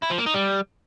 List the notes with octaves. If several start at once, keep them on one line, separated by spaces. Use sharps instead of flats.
E4
F3
A#3
D#4
G3